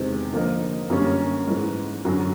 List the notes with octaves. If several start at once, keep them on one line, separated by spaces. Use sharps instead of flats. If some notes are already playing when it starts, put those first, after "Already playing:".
Already playing: E2 C3 D#3 G#3 C4
D3 F3 A#3 D#4
F#2 D3 G3 A#3 C#4
G#2 E3 G#3
F#2 D3 F#3